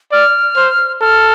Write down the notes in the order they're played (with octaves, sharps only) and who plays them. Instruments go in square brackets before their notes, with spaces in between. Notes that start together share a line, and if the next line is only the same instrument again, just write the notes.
[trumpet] D5 [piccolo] F6
[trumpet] C5
[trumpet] A4 [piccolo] F6